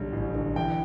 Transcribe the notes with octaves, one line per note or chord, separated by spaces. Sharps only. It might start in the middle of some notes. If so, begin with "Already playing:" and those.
Already playing: B1 D3 G3
A1
D3
E3 G5